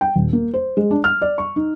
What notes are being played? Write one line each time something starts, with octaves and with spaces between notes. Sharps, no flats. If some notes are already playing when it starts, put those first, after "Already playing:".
G5
D#1
A#3
C5
G#3
D4
F6
D5
C#6
D#4